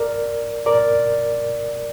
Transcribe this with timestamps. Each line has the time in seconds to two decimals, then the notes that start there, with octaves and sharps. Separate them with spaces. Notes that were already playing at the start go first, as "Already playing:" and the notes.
Already playing: A#4 D5
0.66 A#4 D5